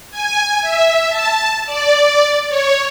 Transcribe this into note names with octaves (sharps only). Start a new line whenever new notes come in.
G#5
E5
A5
D5
C#5